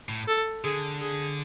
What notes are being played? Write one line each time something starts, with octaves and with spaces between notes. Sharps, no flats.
A2
A4
D3 G#4
G#4